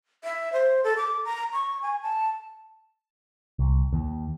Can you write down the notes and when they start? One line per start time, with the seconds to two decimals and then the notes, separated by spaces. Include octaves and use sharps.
0.24 E5
0.53 C5
0.84 A4
0.97 D6
1.25 A#5
1.53 C#6
1.82 G#5
2.02 A5
3.59 C2
3.93 D#2